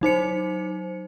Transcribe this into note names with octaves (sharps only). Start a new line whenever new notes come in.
F#3 D#4 C5 C#7